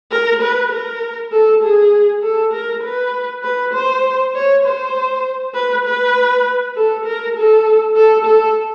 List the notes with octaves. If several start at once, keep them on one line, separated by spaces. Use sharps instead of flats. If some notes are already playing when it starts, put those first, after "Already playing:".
A#4
B4
A#4
A4
G#4
A4
A#4
B4
B4
C5
C#5
C5
B4
B4
A4
A#4
A4
A4
A4